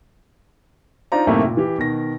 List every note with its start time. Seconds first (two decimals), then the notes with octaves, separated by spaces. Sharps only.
1.12 D4 D#4 F4 C5 D5 A#5
1.27 F#2 A2 C3 A3 A#3 D#4
1.45 A#2
1.57 E3 G4
1.78 B2 D#3 A#6